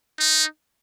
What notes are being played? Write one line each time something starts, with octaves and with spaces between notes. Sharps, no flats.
D#4